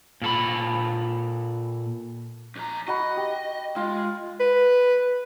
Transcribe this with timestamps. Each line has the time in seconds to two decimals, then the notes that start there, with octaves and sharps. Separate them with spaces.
0.22 A#2 A4 B5
2.56 F2 A#5
2.88 F#4 D#5 B5
3.17 G4
3.76 G#3 F4
4.40 B4